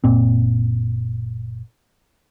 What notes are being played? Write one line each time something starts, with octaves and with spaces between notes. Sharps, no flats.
F#1 A#2 C4